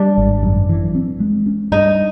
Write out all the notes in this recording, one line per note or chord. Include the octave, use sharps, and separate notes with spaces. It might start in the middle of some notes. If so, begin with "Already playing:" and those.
Already playing: G3 D4
G#1
F#2
E3
C4
G#3
C#4
G2 D#4